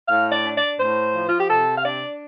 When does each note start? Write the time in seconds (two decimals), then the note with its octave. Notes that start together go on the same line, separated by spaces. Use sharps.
0.08 A2 F5
0.32 D5
0.44 D4
0.56 D5
0.79 A2 C5
1.14 F3
1.28 F4
1.39 G4
1.50 C3 A4
1.78 F5
1.85 D4 D5